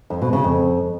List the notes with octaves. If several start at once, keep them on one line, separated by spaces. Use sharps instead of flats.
F2
B2
C#3
F2